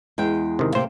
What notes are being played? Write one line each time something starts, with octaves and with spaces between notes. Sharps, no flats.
E2 G#3 G5
C3 D#3
C3 A#3 G4 C5